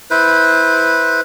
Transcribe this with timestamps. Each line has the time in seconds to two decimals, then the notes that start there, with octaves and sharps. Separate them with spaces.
0.11 E4 B4 C5